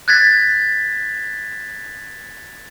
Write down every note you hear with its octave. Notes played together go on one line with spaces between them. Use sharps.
F#6 G#6 A6 B6